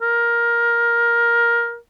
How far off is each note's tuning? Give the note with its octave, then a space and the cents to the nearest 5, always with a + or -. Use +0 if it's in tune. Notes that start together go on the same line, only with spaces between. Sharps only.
A#4 +15